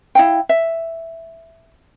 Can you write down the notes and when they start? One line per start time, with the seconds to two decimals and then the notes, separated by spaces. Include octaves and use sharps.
0.15 E4 F5 G5
0.49 E5